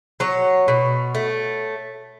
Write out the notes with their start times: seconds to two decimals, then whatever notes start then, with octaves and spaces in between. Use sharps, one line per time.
0.20 F#3 C#5
0.68 B2
1.15 A3